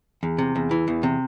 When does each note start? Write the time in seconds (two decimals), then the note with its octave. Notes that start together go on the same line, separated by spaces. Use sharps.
0.23 E2
0.38 C3
0.56 E2
0.71 E3
0.88 E2
1.03 C3